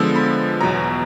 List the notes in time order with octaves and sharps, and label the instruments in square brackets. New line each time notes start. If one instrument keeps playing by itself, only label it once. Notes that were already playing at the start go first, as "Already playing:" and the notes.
Already playing: [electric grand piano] D3 F3 G#3 B3 E6
B5
E2 B2 F#3 A#5